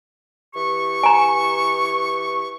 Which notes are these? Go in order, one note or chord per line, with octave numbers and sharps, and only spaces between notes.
E3 G4 C#6
G#5 A#5